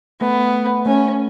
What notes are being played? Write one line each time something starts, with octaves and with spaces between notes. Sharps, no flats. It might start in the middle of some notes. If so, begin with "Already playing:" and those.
A3 B3
A3 C#4